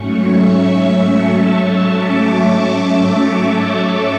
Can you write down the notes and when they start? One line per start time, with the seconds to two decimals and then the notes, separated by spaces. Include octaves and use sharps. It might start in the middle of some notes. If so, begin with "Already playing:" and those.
Already playing: G#2 F#3 A3 C#4 C#6
0.26 E5
1.10 A5
1.52 C#6
1.94 D6